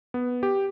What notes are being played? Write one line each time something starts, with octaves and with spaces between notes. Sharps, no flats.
B3
G4